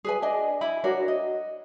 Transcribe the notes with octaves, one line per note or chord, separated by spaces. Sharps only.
G#4 B4 G#5
D4 D#5 G#5
E4 G#5 B5
D4 F#4 A#4 C#5
D#5